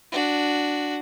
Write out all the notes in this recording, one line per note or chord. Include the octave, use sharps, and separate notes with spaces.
D4 F#4